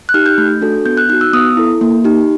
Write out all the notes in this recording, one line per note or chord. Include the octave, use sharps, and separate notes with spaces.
F#6
D#4 G4 F6
G6
A3 G6
D4 F#4 A4
B3 G6
F#6
D#4 F#4 F#6
E6
B3 D#6
E4 A4
A#3
D#4 G4